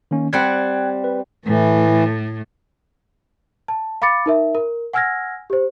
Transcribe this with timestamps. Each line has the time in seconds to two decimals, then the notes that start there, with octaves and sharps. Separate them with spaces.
0.11 D#3 A#3 C#4
0.33 G3 C4 F#5 G5 F#6 G#6
1.04 B4
1.46 A2 E3 A3
3.68 A5
4.02 F5 B5 D6 A6 C#7
4.26 D#4 A#4 E5
4.55 A#4
4.93 F#5 G#5 E6 F6 G#6 A#6
5.50 G4 C5